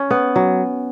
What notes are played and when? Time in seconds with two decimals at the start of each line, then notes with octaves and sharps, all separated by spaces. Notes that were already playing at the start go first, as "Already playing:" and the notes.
Already playing: C#4
0.11 B3
0.36 F#3